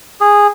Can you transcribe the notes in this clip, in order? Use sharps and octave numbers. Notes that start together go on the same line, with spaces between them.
G#4